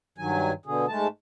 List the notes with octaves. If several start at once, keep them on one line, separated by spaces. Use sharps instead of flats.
G2 D#3 F#3 G#5
B2 D3 G#4
G#2 G#3 A3 A5